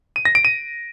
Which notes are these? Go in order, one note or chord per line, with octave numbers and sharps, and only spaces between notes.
D#7
A#6
D7
D#7